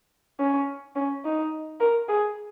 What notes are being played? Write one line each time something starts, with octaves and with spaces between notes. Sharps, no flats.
C#4
C#4
D#4
A#4
G#4